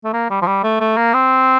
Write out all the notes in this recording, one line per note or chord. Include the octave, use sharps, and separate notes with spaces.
A3
A#3
G3
F3
G3
A3
A3
A#3
C4